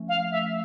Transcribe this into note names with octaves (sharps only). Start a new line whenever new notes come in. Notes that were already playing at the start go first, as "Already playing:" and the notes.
Already playing: F3 A3 C#4
F5
E5